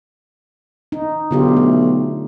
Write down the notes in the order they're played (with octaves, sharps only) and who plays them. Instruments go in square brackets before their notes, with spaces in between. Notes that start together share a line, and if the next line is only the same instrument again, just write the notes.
[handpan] D#4
[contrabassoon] B1 [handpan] D3 F4 G4
[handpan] A3